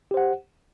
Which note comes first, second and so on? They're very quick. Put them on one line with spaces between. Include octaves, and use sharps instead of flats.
G4 C5 F#5